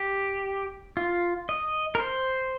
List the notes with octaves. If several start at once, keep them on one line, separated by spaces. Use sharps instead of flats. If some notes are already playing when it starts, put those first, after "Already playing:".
Already playing: G4
F4
D#5
A#4
C5